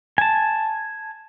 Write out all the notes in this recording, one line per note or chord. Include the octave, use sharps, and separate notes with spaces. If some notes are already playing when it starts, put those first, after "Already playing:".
G#5 A5